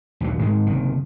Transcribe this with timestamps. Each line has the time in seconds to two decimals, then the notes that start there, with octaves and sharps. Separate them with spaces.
0.20 A#1 D#2 F3 F#3
0.39 G#2 D#3 G#3
0.66 F#1 C3 D#3